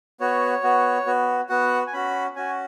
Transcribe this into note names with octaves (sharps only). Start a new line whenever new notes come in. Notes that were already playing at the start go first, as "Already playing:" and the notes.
B3 F#4 C#5
B3 F#4
B3 F#4
B3 F#4 F#5
G#5
C#4 F#4 B5
C#4 F#4 G#5